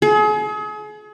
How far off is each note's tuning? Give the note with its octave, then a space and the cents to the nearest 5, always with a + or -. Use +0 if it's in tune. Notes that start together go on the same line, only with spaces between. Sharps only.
G#4 +35